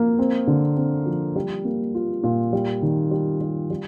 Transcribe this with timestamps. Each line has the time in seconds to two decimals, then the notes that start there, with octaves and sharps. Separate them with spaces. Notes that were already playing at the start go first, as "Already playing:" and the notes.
Already playing: F3 A#3
0.19 C4
0.47 D3
0.77 C4
1.06 F3
1.36 G3
1.65 A#3
1.95 F4
2.23 A#2
2.53 G3
2.82 D#3
3.11 G3
3.41 G3
3.70 G3